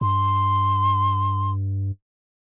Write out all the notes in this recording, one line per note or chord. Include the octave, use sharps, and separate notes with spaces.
G2 C6